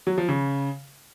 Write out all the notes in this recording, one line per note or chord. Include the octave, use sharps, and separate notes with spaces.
F#3
F3
C#3